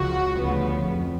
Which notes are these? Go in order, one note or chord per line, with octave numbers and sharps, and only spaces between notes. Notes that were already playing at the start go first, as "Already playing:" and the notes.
Already playing: C#2 C#3 F3 F#4
D2 C#3 F3 B3
F2